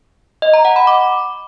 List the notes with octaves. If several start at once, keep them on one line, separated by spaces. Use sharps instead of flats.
D#5
A#5
F#5
B5
D6